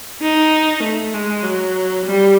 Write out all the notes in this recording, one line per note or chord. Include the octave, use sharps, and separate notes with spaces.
D#4
A3
G#3
F#3
G3